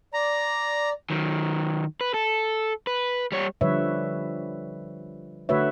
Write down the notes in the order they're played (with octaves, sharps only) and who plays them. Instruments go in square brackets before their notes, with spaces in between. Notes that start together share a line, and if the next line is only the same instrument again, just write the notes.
[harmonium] D5 [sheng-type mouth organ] A#5
[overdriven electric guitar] D#3 F#3
B4
A4
B4
G3 C#5
[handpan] D3 F3 G3 B4 C#5 E5
D3 A3 F#4 B4 C#5 E5